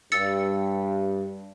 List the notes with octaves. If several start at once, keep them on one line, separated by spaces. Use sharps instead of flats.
G2 E6 A6 C#7